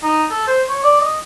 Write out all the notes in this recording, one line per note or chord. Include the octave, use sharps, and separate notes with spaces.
D#4
A4
C5
C#5
D5
D#5